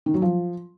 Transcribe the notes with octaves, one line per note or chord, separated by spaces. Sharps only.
D#3
F#3
F3